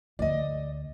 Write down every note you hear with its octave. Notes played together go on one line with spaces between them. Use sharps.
D2 D5 D#5